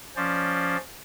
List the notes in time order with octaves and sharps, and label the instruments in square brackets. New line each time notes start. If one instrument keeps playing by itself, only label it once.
[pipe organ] F3 C#4 C5 D5